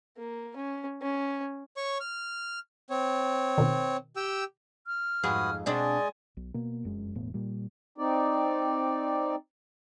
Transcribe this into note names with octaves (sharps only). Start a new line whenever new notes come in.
A#3
C#4
C#4
C#5 C#6
F6
C4 C#5
B2 D#3
G4 G5 E6
F6
F2 G#2 F#4 G#4 B4 D#6
B2 G#3 C4 D4 D5 D#5 G#5
B1
B2 A#3
F1 F#2 G#3
E1 A2 B3
A#2 G3
C4 D#4 D5